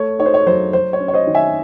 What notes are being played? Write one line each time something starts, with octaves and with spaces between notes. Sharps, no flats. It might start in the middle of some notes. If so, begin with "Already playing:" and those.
Already playing: A3 C#5
D#4 C#5
C5
C#5
F#3 C5
F#3 C5
C#5
C#4
C#5
C5 D#5
D#3
E5 G#5